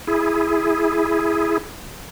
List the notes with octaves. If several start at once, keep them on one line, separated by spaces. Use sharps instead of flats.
E4 G#4